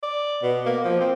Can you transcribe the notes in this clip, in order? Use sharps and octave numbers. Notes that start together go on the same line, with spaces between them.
D5
B2
A#3
F3
C4